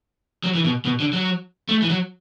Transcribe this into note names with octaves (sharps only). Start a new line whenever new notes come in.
F#3
E3
B2
B2
D3
F#3
A3
E3
F#3